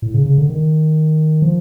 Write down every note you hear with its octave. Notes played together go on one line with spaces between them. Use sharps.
A2
C#3
C#3
D3
D#3
F3